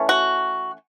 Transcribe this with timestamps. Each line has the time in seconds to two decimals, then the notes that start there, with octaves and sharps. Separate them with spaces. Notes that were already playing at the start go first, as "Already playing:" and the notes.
Already playing: E3 A3 C#4
0.09 F#4